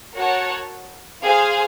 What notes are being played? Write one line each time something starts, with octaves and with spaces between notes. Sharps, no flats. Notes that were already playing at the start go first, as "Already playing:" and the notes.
F#4 A#4 C#5 F#5 A5
G#4 C5 F5